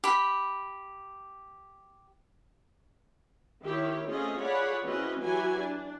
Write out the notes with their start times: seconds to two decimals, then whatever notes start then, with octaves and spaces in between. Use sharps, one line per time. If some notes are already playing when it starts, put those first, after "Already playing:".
0.04 G4 B5
3.65 D#3 E4 G4 C#5
4.08 A3 C4 C#4 F4 G#4 D#5
4.40 F4 G#4 C#5 D5 F#5 B5
4.84 E3 C4 C#4 F#4 B4 D#5
5.21 E3 F#3 F#4 G4 B4 G#5
5.57 D4